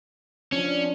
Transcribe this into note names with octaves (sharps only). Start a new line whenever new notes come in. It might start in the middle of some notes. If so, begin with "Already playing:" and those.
F3 C#4 D4